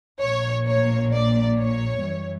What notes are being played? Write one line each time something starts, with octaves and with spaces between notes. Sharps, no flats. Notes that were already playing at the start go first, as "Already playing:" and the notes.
A#1 A#2 A#3 C#5
C#5
D5
C#5
F#2 E3 G3